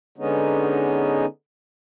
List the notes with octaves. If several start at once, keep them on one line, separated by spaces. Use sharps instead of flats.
D3 G#3 B3 C#4 D#4